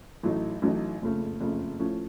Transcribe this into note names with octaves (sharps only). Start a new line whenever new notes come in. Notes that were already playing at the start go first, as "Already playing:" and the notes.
A1 A2 F#3 A3 D#4
A1 A2 F#3 A3 D#4
F#1 F2 C#3 A3
F#1 F2 C#3 A3
A2 F3 A3 C#4